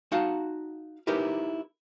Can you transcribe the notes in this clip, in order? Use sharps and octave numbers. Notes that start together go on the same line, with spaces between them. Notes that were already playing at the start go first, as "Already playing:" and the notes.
D#4 F#4 F5 F#5 A5
D#4 E4 G4 A#4 B4